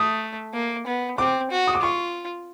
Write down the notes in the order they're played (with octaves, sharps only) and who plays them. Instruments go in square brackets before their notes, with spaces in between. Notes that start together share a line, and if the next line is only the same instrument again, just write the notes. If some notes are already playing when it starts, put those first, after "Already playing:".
Already playing: [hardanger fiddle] A3 [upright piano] D#6
[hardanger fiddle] A#3
B3
[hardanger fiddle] C4 [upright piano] D6
[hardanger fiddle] F#4
[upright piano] D#6
D6
[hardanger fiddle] F4 [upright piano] C#6